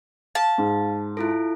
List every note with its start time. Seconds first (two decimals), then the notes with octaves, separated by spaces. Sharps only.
0.35 F5 A5
0.58 G#2
1.17 E4 F4 A4